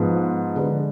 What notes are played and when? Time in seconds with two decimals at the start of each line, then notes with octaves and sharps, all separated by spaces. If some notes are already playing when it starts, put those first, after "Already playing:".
Already playing: G#2 F3 B3
0.55 D3 G#3 D4 G#4 B4